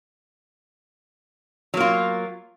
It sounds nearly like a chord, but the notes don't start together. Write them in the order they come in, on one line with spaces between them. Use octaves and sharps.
F#3 A#3 F4